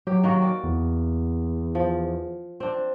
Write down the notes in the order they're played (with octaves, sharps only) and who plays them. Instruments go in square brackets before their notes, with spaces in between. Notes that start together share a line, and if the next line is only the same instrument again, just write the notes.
[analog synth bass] F#3 [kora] G4
[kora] D#3 A#3 F#4
D5
[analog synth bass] E2
[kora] F3
C4 D4